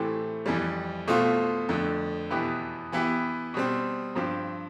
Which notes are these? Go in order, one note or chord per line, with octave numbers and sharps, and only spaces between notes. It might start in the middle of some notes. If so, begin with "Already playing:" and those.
Already playing: A2 E3 A3 C4 G4
F2 E3 G3
B2 A3 C4 F4
F2 D3 A3
E2 B2 B3 E4 G4
E3 B3 E4 G4
B2 G3 C4
G2 F3 C4 G4